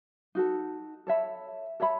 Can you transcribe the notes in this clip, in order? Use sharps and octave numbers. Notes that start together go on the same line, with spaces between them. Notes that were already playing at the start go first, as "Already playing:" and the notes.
D#4 F#4 A4
A4 C#5 E5 B5
A4 C#5 E5 B5